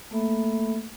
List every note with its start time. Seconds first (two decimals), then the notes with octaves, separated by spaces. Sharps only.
0.11 A3 A#3 A4 E5 B5